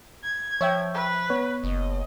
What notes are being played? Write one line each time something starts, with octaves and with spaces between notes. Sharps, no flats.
G#6
F3 C#5 E5 G5
B4
B3 C#5
F#1 D#5